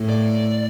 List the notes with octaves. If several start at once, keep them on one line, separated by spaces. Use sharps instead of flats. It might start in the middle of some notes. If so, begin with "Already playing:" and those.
Already playing: A2
D5